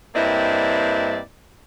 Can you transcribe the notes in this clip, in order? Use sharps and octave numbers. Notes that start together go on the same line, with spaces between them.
G2 A#3 C4 E4 D5 D#5